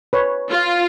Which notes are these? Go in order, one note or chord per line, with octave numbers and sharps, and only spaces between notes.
B4 C#5
F4